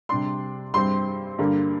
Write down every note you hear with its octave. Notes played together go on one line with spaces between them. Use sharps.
C3 G3 D4 C6
G2 G3 C4 C6
G2 D3 A#3 D4